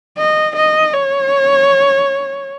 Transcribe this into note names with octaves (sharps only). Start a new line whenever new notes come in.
D#5
D#5
C#5